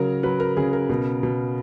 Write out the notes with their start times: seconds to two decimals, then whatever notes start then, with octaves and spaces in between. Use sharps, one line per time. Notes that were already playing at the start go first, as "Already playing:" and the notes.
Already playing: C#3 F#3 A#4
0.23 F#3 B4
0.40 A#4
0.57 C#3 G#4
0.73 A#4
0.89 B2
1.23 B2